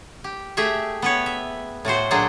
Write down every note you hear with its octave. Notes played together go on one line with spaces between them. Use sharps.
G4
A3 G4 G#4 E5
B3 B4 C#5
E5
A2 A3 F#4 C5
A#2 F#3 D4 G#4 C5